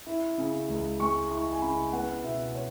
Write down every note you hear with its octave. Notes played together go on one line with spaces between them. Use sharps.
E4
C#3
C#2
G#3 C#6
E4 C#6
G#5
C#3 B5
B3 F#5
B2 E5
C#5